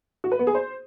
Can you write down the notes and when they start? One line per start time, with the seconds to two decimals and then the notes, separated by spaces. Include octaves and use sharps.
0.24 F#4
0.32 B4
0.39 B3
0.47 G#4
0.55 C5